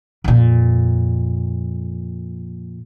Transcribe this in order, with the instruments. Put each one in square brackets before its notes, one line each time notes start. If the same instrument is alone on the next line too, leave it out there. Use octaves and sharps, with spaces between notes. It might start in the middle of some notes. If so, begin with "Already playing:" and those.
[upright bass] F2 A#2